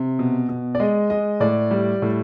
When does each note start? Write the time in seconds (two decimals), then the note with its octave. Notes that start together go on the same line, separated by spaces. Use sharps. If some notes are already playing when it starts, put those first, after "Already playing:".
Already playing: C3
0.19 B2
0.49 B2
0.75 D5
0.80 G#3 D#5
1.10 G#3 D#5
1.40 A2 D5
1.71 G3
2.02 A2